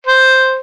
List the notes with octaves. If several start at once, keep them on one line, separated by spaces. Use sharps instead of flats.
C5